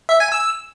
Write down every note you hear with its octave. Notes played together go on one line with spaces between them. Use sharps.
E5
G#5
E6